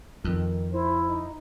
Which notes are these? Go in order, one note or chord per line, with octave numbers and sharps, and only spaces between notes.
F2 D#3
E4 C5
D#4